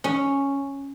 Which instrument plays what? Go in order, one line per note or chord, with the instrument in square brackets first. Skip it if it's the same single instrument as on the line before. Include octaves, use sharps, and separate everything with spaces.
[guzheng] C#4